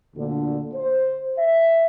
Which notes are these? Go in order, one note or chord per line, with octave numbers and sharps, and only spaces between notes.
D2 A#2 D3
C5
E5